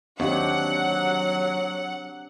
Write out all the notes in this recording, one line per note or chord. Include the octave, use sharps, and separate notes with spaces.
D#2 F#3 C4 D4 G4 F#5